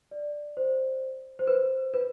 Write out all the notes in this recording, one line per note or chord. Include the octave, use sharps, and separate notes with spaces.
D5
C5
C5
B4
B4